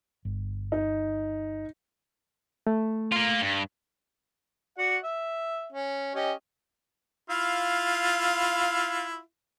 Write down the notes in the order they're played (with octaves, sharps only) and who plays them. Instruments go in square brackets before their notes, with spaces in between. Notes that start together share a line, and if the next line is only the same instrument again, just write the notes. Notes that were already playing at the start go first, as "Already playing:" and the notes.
[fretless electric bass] G1
[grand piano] D#4
[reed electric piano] A3
[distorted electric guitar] A#3 F4
G2
[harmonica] F#4 D5 F#5
E5
C#4
C#4 G4 D#5
E4 F4 F5